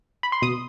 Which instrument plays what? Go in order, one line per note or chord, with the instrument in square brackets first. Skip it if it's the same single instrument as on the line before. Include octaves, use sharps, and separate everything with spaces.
[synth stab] B5
C6
B2 D#6